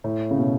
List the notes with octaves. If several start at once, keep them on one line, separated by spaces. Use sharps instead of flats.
A2
C#3
B2